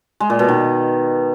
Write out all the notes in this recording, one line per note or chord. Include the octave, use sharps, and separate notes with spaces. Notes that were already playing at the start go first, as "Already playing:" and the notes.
G#3
A#2
B2
D#3